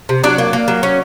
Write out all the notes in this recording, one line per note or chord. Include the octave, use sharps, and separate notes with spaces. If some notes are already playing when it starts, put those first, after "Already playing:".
C3
F#3 D4 D5
A#3
A#3
F#3
C#4